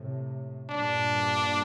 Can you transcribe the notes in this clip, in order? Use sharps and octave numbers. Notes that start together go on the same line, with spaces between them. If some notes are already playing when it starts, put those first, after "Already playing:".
Already playing: A2 C3
G2 A#2 D4